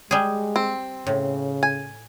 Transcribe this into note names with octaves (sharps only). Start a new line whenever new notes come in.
G3 G#3 G#4
C4
A2 C#3
G#5